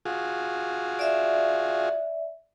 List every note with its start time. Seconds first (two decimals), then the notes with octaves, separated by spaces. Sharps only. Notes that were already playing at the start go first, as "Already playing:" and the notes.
0.05 F4 F#4 G#4
0.99 D5 E5